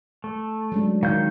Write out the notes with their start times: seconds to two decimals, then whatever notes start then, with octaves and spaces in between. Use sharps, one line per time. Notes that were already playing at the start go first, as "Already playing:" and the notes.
0.24 A3
0.72 F#3 G#3 D4
1.03 D#3 F5 G6